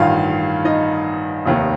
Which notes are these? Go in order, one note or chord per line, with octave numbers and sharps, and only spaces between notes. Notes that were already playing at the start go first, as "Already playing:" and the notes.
Already playing: A1 G2 D#3 F4 F5
D#4 D#5
F1 D#2 D#3